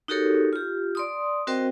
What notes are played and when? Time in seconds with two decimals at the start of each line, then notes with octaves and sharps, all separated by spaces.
0.08 D#4 F#4 G4 A4 A#4 C#5
0.53 F4 G4
0.95 D5 C6 D#6
1.47 C4 F#4 A#4 C5 D#5 G5